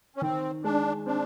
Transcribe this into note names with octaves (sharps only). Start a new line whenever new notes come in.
C#4
D#3 C4
G#3 D4
C4 D4